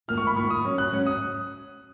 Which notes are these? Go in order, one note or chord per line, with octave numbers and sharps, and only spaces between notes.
G#2 D#3 A#3 F4 F6
C#6
B5
G#2 D#3 A#3 F4 C#6
D#6
G#2 F#3 C#4
F#6
G#2 F#3 C#4
D#6